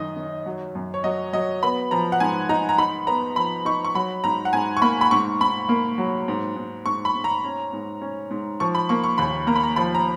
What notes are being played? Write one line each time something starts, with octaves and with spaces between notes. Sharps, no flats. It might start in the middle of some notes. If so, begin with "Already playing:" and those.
Already playing: F#2 D#3 D#5
D#3
F#3
F#2
C#5
F#3 D#5
F#3 D#5
B3 B5
F3 A#5
F#5
G#2 G#5
D#4 A#5
A#5
D#4 B5
B3 A#5
F3 B5
D#4 C#6
C#6
F#3 B5
G#2 A#5
F#5
G#2 G#5
C#6
A#3 B5
B5
G#2 C#6
G#2 B5
A#3
F#3
G#2
G#2
G#2 C#6
B5
G#2
A#5
C#4
G#2
C#4
G#2
F3 C#6
B5
A#3 C#6
C#6
D#2 B5
A#3 A#5
B5
A#5
F3 B5
A#5